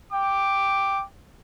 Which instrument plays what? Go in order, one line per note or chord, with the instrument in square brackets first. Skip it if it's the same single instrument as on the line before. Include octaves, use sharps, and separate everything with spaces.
[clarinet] G5 [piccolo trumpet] D6